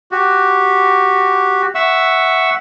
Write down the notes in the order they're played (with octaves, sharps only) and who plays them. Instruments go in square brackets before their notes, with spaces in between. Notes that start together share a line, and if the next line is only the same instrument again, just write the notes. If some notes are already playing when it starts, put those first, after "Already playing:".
[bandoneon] F#4 G4
E5 F#5 C#6 E6